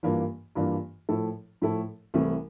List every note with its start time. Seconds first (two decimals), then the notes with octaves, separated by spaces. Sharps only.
0.03 G2 E3 A#3 D4 F4
0.55 G2 E3 A#3 D4 F4
1.09 A2 F3 A3 E4 A4
1.62 A2 F3 A3 E4 A4
2.14 C2 C3 E3 A3 C4